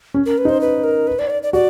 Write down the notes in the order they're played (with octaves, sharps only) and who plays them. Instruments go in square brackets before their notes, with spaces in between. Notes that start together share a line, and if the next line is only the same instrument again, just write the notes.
[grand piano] C#4
[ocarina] A#4
B4
[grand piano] D#4 [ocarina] C5
[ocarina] B4
A#4
B4
D5
C#5
D5
D5
[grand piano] F#4 [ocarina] D5